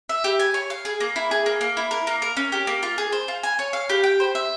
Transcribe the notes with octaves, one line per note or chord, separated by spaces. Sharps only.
E5
G4
G#5
C#5
F5
G#4
A#3
E4
G#4
A#3
A#3
E4
A#4
A#3
A#4
C#4
G4
A#3
F4
G#4
C5
F4
G#5
C#5
F5
G4
G5
C5
E5